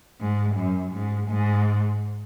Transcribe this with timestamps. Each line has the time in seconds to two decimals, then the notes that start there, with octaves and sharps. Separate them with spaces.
0.20 G#2
0.56 F#2
0.92 G#2
1.28 G#2